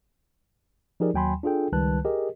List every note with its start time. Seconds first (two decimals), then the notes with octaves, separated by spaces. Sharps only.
1.00 F3 D#4 G4 G#4 A#4 D5
1.14 D#2 F#3 G5 G#5 B5 C6
1.43 D4 F4 G#4 A4 G5
1.72 C#2 D#3 G3 B4 A5 F#6
2.05 G4 G#4 A#4 D#5